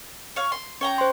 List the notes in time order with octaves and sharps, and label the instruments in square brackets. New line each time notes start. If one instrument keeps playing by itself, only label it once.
[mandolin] C#5 F5
C6
[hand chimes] C#4 [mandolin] C#5 G5 A#5
[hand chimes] C5 C6